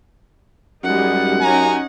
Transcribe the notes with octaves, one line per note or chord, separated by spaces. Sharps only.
F#2 G3 G#3 D#4 F#5
C#4 D#4 G4 G#5 A#5